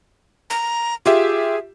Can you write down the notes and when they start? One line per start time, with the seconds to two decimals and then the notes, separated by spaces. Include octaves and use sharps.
0.50 A#5
1.06 F4 G4 G#4 E5